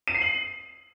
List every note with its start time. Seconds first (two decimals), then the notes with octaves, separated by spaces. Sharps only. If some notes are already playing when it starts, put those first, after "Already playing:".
0.08 D#7
0.14 C7
0.21 F#7